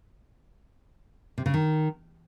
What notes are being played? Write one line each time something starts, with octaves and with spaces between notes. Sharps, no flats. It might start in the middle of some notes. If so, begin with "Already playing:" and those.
C3
C#3
D#3